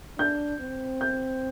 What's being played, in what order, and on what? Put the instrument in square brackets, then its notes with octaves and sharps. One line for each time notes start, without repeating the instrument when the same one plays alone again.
[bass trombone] D4 [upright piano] G6
[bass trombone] C4
[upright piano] G6